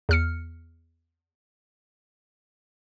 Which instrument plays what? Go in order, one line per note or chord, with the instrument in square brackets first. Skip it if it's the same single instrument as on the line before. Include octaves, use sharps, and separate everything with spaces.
[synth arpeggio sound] E2 F6 C#7